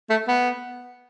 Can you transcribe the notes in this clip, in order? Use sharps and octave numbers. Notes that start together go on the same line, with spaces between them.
A3
B3